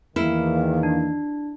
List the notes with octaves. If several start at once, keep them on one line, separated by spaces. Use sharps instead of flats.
E2 D#3 A#3 E4 A#4
D4